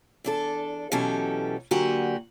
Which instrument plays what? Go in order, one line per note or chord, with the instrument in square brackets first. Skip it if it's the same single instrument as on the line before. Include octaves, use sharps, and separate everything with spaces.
[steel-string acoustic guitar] E2 D4 A4
B2 E3 F#3 C#4 G4 A4
D3 F#3 A#3 F#4 G4 G#5